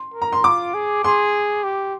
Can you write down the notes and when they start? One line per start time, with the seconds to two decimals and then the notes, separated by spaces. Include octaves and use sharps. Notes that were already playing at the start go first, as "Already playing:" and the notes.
Already playing: C6
0.14 A#4
0.22 A#5
0.32 C6
0.44 F4 D6
0.74 G#4
1.04 G#4 C6
1.64 G4